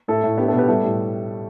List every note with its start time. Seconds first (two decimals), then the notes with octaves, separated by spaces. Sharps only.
0.08 A2 E4 A4
0.23 A2
0.37 B3 D4 G4
0.48 E4 A4
0.53 B2
0.58 G4 B4
0.68 G3 E4 A4
0.83 A2